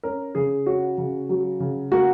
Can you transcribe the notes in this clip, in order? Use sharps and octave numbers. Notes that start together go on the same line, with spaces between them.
C#4 A#4
C#3 G#4
C#4 F#4
C#3
F#3
C#3
A#3 F#4